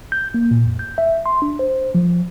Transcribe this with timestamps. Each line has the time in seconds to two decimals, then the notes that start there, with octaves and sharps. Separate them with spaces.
0.12 G6
0.34 A#3
0.51 A#2
0.66 F2
0.79 G6
0.98 E5
1.26 C6
1.42 D4
1.59 C5
1.95 F3